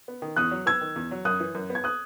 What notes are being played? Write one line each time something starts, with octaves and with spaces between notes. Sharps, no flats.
B3
D#3
E2 D#6 F#6
F#3
B3 E6 G#6
D#3
E2
F#3
F#2 D#6 F#6
E3
F#2
B3
G#6
D#6 F#6